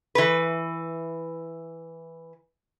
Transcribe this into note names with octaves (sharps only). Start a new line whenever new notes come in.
E3 B4